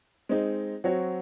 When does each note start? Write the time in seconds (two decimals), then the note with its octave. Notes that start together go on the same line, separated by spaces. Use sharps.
0.29 G#3 C4 D#4
0.84 F#3 C4 F#4 C#5